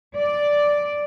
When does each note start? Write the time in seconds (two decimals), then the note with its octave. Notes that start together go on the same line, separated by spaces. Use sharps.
0.16 D5